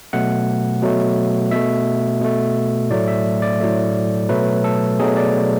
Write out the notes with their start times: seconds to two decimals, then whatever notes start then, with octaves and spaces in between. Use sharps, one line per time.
0.13 B2 F#3 A3 F#5
0.82 B2 F#3 A3
1.51 B2 A3 E5
2.21 B2 A3
2.91 A2 F#3 A3 D5
3.08 E5
3.42 D5
3.60 A2 F#3 A3
4.29 B2 F#3 A3 B4
4.64 A4
4.99 B2 F#3 A3 G#4
5.17 D5